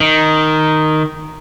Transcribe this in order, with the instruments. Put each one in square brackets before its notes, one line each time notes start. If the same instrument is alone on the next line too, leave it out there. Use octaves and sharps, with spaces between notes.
[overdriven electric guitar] D#3